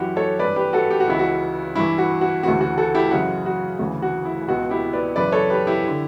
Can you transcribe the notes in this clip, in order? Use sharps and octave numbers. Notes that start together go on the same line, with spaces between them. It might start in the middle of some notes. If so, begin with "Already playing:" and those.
Already playing: F#2 E3 E4 F#4 G4
A4 C#5
G2 E3 B4 D5
G4 B4
F#4 A4
G4
F#4
C#2 C#3 E3 E4
F#4
G2 E3 E4
F#4
F#4
D2 C#3 E3 F#4
F#4
F#4 A4
E4 G4
F#2 C#3 E3 F#4
F#4
D2 C#3 E3
F#4
E4
C#2 B2 F#4
E4 G4
B4 D5
F#2 C#3 E3 B4 D5
A4 C#5
G4 B4
E4 G4
D3